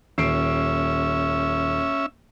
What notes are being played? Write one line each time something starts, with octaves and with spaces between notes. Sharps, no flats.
D#1 C#4 E5 C7 D7